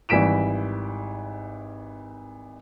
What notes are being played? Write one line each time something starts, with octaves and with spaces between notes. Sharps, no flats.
G#1 E3 G3 B6 D7 E7